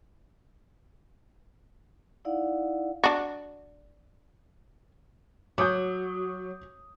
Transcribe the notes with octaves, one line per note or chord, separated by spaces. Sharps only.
D#4 E4 D5 F5 F#5
D4 F#4
F#3 D6 D#6 G6